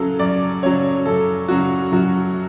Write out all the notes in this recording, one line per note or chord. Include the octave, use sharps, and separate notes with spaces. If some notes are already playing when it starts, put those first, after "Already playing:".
Already playing: F#2 C#3 F#3 A4
F#2 D5
C#3 F#3 C#5
F#2 A4
C#3 F#3 F#4
F#2 F#4